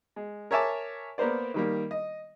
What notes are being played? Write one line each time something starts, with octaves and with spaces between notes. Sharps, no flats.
G#3
A#4 C#5 E5 G#5 A5 D6
A#3 B3 A#4 C5 D5
D#3 G3 A#3
D#5